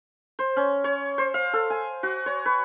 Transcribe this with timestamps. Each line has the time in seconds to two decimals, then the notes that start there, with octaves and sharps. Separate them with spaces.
0.39 C5
0.56 C#4
0.84 C#5
1.18 C5
1.34 F5
1.53 A4
1.70 G#5
2.03 F#4
2.26 C#5
2.46 B4